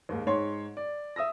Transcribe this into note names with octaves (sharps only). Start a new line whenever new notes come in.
D#2 G#2
G#2 C#5 C6
D5
E5 D#6 E6 A#6